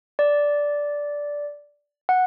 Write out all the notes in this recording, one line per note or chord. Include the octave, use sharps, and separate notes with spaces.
D5
F#5